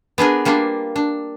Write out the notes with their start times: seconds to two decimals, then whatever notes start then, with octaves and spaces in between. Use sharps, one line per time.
0.18 B3 D4 G#4 A#4
0.45 G3 A#3 D4 F4
0.96 D4